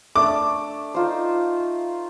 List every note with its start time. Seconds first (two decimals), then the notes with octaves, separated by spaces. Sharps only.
0.16 A3 D4 D6
0.94 D#4 F4 C5